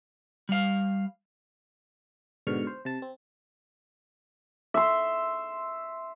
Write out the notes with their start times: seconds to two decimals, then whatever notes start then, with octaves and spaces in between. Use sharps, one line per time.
0.49 G3 F5
2.47 G#2 B2 D3 C#6 F6
2.67 C5
2.85 C3 A5
3.02 C4
4.74 E5 C6